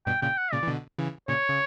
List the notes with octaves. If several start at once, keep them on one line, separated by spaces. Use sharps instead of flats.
G2 B2 G5
A#2 C#3 G5
F#5
A#2 C#3 D5
E3
B2 D3
C#3 E3
A#2 C#3 C#5
C#3